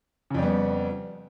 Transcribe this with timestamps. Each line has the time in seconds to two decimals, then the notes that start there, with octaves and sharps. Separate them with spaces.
0.30 C#3
0.34 F2
0.39 G3
0.43 B3